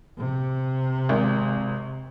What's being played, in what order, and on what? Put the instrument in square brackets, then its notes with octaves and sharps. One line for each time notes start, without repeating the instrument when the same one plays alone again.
[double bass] C3
[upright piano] G#1